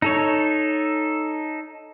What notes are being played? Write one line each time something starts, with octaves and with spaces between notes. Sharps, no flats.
D#4 A4 C#5